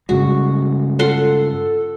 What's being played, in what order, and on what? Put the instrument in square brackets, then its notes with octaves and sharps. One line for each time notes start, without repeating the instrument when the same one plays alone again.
[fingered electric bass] G2 C#3 G#3 [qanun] F#4
[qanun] F4 F#5 C6 [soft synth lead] A4